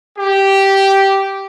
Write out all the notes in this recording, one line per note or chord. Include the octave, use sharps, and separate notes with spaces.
G4